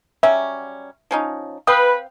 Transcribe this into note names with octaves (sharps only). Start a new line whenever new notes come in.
F#3 G3 C#4 E5
F3 C#4 D#4
C4 B4 F5 G5 D#6